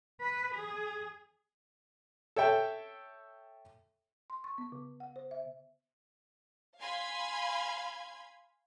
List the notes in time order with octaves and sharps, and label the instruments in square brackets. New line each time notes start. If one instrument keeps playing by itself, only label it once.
[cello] B4
G#4
[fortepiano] A4 C#5 E5 G5
[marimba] C6
C#6
B3
C#3
F#5
C5
E5
[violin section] F5 G#5 B5 C6 G#6